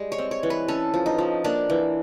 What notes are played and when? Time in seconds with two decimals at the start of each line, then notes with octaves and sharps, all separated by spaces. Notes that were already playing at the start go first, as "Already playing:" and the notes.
Already playing: G3 G#3
0.12 C#5
0.18 C4
0.31 C#5
0.43 E3
0.50 B4
0.68 C#4 A4
0.94 F3
1.06 D#4
1.18 F3
1.44 A#3 D4
1.70 E3